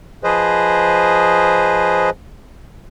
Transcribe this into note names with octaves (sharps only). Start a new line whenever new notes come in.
F3 G#4 B4 C5 D#5